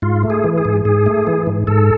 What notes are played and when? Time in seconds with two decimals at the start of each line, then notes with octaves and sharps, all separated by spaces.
0.02 G#2 F4
0.23 A3
0.30 G#4
0.44 E3
0.58 G#4
0.65 G#2
0.85 G#2 G#4
1.06 A3
1.27 E3
1.47 G#2
1.67 G#2 A4